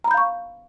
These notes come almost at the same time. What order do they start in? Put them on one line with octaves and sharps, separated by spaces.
A#5 B5 G6 F5 C#6